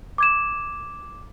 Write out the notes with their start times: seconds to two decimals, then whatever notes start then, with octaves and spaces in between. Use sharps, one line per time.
0.18 D6 G#6 E7